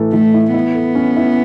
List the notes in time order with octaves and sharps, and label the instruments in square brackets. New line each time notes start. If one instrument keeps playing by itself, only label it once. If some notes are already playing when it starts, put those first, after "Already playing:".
Already playing: [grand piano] A2 E3 A4
[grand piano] E3 [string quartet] A3
[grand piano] E4
[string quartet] B3 [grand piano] E4
[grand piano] A4
C#4
E4